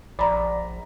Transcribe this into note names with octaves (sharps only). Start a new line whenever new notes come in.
A#1 D5 A#5 B5